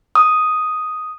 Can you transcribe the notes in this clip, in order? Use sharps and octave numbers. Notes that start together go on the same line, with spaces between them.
D#6